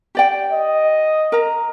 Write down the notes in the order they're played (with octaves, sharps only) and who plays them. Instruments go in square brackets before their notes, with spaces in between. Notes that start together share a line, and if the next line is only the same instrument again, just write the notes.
[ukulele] G4 D5 G5
[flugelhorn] D#5
[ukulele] A#4 A#5